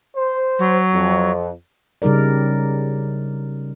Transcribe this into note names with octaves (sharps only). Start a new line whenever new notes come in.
C5
F#3
F2
C#3 G3 D#4 A#4 D5